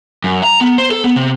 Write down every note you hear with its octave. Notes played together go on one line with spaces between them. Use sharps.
F#2
A#5
B3
C5
A4
B3
C3